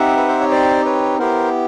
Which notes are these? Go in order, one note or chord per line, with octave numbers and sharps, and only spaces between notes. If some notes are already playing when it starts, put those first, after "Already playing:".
Already playing: C4 D#4 G4 E5 F#5
B4
C5
C#5
C5 D5
B4 C#5
B3 E4 G4 A#4 C5